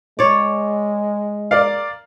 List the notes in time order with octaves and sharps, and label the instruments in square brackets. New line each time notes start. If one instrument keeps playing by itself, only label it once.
[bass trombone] G#3 [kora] C#5 D5
[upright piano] A#4 D5 F5